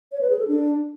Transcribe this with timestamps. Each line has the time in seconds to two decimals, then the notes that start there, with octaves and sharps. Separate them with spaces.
0.12 C#5
0.21 B4
0.30 G#4
0.39 A4
0.48 D4